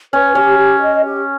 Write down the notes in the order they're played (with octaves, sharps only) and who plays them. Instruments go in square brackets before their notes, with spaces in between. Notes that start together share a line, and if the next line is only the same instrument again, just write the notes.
[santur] C#4 [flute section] B4
[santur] C#4 [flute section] G4
[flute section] G4
D#5
G4